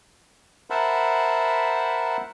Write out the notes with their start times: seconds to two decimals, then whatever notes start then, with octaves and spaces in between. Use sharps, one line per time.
0.70 A#4 C5 E5 F#5 A5 B5